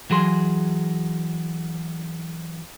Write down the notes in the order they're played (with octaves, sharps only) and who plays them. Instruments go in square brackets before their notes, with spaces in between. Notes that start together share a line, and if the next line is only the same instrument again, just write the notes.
[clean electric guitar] E3 F#3 G#4 C6